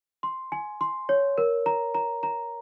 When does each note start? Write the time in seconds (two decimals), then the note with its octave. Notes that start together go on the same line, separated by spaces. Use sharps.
0.23 C6
0.52 G#5
0.81 C6
1.09 C#5
1.38 A#4
1.66 A#5
1.94 A#5
2.23 A#5